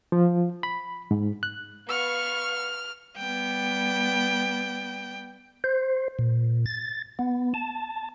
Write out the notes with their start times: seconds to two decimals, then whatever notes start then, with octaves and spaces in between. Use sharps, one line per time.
0.12 F3
0.63 B5
1.11 G#2
1.43 F#6
1.89 B3 F5 C#6 F6
3.17 G3 B3 G5
5.64 C5
6.19 A#2
6.66 A6
7.19 B3
7.54 A5